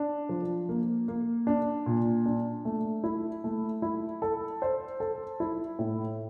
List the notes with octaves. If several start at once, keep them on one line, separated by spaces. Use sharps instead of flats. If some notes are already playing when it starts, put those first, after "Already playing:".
Already playing: D4
F3
A#3
A#3
D4
A#2
D4
A3
E4
A3
E4
A4
C5
A4
E4
A2